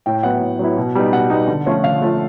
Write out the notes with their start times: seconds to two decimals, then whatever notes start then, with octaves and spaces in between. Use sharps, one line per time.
0.06 A2 G5
0.23 F#3 B3 E4 F#5
0.41 A2
0.59 F#3 B3 E4
0.77 B2
0.95 G3 B3 D#4
1.12 B2 F#5
1.30 G3 B3 D#4
1.48 D3
1.66 F3 A3 C#4 F4
1.84 D3 F5
2.02 F3 A3 C#4 F4